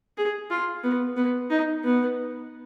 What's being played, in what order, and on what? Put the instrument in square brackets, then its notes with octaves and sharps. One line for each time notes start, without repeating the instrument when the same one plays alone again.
[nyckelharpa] G#4
F4
B3
B3
D#4
B3